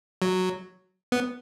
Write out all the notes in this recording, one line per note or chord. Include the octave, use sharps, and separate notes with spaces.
F#3
B3